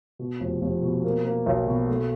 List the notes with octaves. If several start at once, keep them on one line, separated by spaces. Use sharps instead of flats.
B2
F1
F1
B2
A#3
A#3
B1
B2
A3